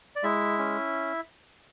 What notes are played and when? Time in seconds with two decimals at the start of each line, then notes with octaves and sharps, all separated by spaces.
0.16 D5
0.23 G#3 E4 E5
0.59 C#4